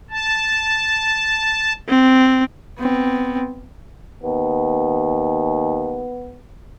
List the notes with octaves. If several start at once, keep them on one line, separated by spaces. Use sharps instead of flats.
A5
C4
B3 C4
D#2 B3